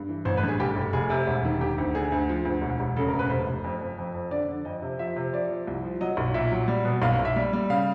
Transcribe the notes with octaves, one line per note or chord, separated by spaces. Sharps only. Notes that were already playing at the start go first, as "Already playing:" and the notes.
Already playing: G2
E3
A1 C5
B4
G2 G#4
F1 G4
F1
F1 G#4
C3
E1
D#3
D#3 G4
D2
D3 G#4
D2
F3
D2
E1
E1
C#3 A4
A#4
E1
B4
F1 C5
F1
F2
F2
F2
F2
D3 D5
D3
F2 D#5
C3
F3 E5
C3
F3 D5
F3
C2
F3
F#3 D#5
B1
A#2 E5
F#3
G3
B2
B1 F5
F5
B1
E5
G3
G3
C#3 F5